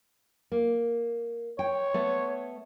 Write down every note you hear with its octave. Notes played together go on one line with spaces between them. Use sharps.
A#3
C#5 G5
A3 B3